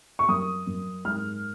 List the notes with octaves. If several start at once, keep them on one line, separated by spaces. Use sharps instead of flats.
C#6
F#2 D#6
F#2
G#2 F6